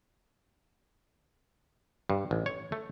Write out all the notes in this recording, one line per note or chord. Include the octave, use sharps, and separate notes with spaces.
G2
A1
C#5
A3